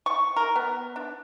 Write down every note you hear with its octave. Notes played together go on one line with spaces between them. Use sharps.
C#6
A#4
B3
D4